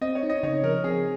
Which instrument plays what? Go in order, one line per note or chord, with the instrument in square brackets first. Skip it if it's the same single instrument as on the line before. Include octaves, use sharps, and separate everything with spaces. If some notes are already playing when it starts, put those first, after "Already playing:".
[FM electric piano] C4 [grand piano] D#5
[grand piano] C#5
[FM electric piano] D#4
[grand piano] D#5
[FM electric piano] C#3 [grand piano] C#5
[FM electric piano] F3 [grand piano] A#4
[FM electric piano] C4 [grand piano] G#4